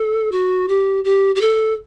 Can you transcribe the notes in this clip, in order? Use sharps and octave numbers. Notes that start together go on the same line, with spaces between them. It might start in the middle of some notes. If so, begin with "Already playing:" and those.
Already playing: A4
F#4
G4
G4
G4
A4